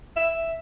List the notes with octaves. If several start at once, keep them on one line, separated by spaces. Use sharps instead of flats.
E5